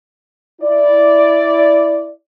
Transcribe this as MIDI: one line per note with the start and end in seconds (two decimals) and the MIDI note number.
0.62 2.11 64
0.62 2.11 74